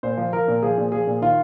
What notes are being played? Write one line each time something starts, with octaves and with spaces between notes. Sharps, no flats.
A#2 C5
F3
F3 A#4
A#2
F3 G#4
A#2
F3 G#4
A#2
D#3 F4